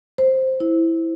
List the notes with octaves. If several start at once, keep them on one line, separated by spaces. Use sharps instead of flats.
C5
E4